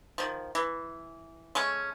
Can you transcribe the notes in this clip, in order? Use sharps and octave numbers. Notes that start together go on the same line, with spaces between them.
D#3 F3
E3
G#3 A3 C#4